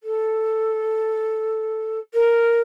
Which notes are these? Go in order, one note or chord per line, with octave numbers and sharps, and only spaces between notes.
A4
A#4